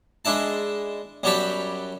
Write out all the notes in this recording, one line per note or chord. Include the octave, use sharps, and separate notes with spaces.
G#3 D4 E4 A5
F#2 F#3 G3 G4 A5 B5